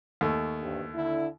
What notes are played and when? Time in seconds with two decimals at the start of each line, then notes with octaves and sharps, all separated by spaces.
0.21 D#2 A3
0.60 D2 G2
0.94 D3 E4